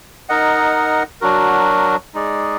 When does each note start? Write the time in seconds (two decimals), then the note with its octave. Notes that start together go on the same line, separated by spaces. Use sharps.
0.29 D#4 A#4 D#5 F#5
1.21 F#3 D4 F#4 A#4
2.14 G#3 D#4 G#4 D5